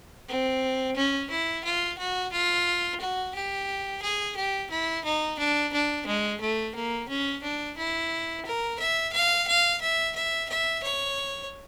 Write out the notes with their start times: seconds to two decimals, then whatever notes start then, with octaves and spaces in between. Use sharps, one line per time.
0.29 C4
0.96 C#4
1.30 E4
1.64 F4
1.99 F#4
2.32 F4
3.00 F#4
3.35 G4
4.02 G#4
4.36 G4
4.71 E4
5.05 D#4
5.39 D4
5.73 D4
6.06 G#3
6.41 A3
6.75 A#3
7.09 C#4
7.43 D4
7.78 E4
8.46 A#4
8.79 E5
9.13 F5
9.48 F5
9.81 E5
10.16 E5
10.50 E5
10.84 C#5